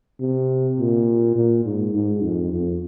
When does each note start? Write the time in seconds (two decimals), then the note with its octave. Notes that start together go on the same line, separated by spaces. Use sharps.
0.21 C3
0.78 A#2
1.36 A#2
1.65 G#2
1.95 G#2
2.23 F2
2.53 F2